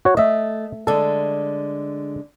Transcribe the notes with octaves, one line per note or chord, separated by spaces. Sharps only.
F#4 C#5
A3 D#5 E5
D3 G#3 A4